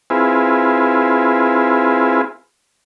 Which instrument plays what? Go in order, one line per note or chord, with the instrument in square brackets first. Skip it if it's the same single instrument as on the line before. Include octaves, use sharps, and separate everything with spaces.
[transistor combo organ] C4 E4 F4 G#4 B4